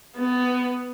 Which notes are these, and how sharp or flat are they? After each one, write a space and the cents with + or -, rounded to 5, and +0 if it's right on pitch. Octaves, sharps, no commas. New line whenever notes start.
B3 +15